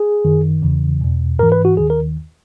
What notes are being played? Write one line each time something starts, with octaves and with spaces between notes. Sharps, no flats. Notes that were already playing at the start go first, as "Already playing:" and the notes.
Already playing: G#4
F#2 D#3
E2 C#3 E3
E2 B2
G#2 E3 A#4
B4
F#4
D#2 D#3 G#4
A#4